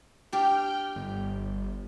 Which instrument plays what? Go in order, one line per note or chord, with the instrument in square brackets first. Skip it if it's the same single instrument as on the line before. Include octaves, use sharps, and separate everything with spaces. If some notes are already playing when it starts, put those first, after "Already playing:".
[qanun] D4 G4 [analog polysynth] G5 F6 G6
[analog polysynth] G1